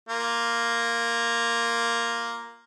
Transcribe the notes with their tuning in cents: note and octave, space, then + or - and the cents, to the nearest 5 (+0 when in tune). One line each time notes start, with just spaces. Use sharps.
A#3 +0 F4 +0